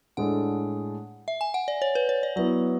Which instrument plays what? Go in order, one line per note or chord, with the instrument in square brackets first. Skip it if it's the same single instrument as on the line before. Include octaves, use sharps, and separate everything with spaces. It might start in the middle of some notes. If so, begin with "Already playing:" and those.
[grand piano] A2 G#3 D4 A4 [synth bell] F#5
[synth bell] E5
G#5
F#5
D5
C#5
B4
C#5
D5
[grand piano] F#3 B3 E4 [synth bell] D5